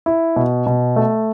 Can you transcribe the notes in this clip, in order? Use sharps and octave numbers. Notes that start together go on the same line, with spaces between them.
E4
B2
B2
A3